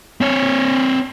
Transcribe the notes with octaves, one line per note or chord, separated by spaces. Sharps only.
C4 C#5